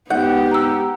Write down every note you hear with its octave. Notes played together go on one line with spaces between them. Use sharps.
G#2 B3 G4 F#5 G6
A#5 E6